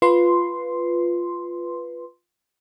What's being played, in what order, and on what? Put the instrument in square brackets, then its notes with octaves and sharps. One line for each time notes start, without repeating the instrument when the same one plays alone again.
[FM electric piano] F4 B4 C6